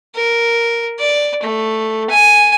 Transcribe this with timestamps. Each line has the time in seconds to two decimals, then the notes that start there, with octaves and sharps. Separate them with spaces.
0.16 A#4
0.99 D5
1.43 A3
2.10 G#5